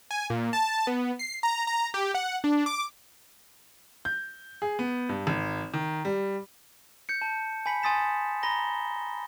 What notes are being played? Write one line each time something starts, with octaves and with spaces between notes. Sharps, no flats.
G#5
A#2
A5
B3
C7
A#5
A#5
G4
F#5
D4
D6
G6
G#4
B3
G2
G#1
D#3
G3
G6 C#7
A5
G#5 B5 B6 C#7 F#7
G#5 C6 D#6 A6 B6 E7
G#5 A#5 B5 A#6 G7